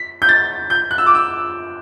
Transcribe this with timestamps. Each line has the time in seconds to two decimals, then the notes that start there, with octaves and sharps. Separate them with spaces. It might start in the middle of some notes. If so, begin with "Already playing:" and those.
Already playing: B6
0.22 G6
0.29 A6
0.70 G6
0.91 F#6
0.98 E6
1.06 D6
1.15 E6